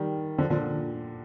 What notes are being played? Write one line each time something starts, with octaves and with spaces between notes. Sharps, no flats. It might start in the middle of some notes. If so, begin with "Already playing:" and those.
Already playing: D#3 G3
D3 F3
A#2 D3